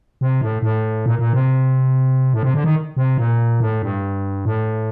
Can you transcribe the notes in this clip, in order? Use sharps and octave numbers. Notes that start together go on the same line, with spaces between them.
C3
A2
A2
A#2
A#2
C3
A2
C3
D3
D#3
C3
A#2
A2
G2
A2